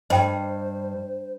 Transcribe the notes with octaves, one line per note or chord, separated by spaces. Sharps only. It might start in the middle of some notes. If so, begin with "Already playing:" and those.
G2 C5 D#5 G5